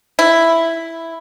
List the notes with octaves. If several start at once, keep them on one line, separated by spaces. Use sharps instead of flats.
E4